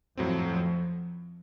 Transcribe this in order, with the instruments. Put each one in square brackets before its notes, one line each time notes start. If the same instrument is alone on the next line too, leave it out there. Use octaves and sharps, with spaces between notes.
[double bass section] F2 F3 [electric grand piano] A2 F#3 C4